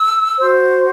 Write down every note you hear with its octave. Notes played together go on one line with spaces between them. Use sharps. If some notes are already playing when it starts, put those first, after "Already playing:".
Already playing: E6
F#4 C5